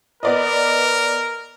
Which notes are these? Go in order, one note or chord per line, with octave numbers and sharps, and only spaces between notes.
B3 A#4 D5 D#5